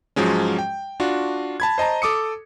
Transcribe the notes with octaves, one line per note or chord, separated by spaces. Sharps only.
G#2 F3 F#3 G#3 C#4
G5
D4 F4 F#4
A5 B5 G#6
C5 D#5 A5 A#5
A4 D6 D#6 C#7